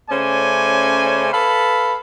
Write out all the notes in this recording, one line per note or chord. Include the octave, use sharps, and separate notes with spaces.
C#3 A3 C#4 C5 D5 G#5
A4 B4 F5 B5